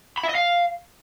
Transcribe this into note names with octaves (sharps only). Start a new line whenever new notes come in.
B5
E5
D#5
F5